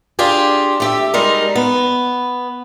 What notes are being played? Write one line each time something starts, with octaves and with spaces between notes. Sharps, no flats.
D4 F4 G4 G#4
A3 G4 E5
G3 G#3 D#4 A#4
B3